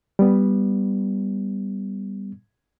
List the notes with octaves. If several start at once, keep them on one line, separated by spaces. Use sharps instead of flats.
G3 B3